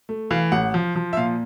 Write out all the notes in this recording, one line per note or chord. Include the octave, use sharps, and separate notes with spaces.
A3
E3 F5
A1 F#5
F3
F3
E5
A#2 F5